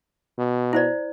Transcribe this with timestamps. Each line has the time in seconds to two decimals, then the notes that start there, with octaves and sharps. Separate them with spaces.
0.38 B2
0.73 E4 C5 D5